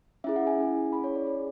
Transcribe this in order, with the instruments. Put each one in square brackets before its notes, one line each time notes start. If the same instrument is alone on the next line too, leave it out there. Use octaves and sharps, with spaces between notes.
[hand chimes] C#4 E4 G#4 E5
F#5
G#5
C#4 E4 G#4
C#4 G#4 B5
C#5
D5
C#4 G#4 C#5